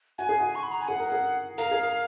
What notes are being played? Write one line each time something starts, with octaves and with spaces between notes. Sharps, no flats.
F#4 G#5
G#4
F#4
C#6
B5
A#5
G#5
G#4 F#5
A#4
G#4
A#4 F5
G#4
A#4